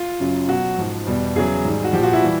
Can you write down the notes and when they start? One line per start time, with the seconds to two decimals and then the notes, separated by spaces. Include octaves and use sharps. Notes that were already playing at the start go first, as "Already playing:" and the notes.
Already playing: F4
0.20 F#2 C#3 F#3
0.48 B2 F#3 F#4
0.78 G#2 F3
1.06 E2 B2 G3
1.35 E2 C#3 F#3 G#4
1.65 G#2 D#3 G3
1.84 F#4
1.93 F3 G4
1.98 A#2
2.03 F#4
2.13 E4
2.22 E3 G3